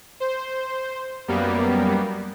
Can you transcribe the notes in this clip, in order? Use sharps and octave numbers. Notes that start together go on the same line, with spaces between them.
C5
F#2 G3 A#3 B3